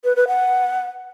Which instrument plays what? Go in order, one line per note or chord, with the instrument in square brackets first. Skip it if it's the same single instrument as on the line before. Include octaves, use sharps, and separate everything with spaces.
[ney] B4
B4
F#5